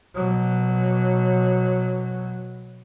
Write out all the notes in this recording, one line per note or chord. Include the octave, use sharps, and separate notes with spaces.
B2 F#3